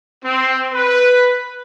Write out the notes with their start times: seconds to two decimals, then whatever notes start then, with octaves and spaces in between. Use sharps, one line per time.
0.24 C4
0.73 B4